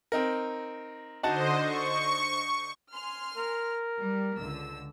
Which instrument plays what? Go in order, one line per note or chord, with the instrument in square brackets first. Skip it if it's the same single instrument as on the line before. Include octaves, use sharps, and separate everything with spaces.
[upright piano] C4 D#4 A#4
[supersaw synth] D3 C5 D#5 [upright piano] D#4 F#4 A5
[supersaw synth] C#6
[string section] G#5 C6 F6
[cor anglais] A#4
[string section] G3
C#2 D3 E6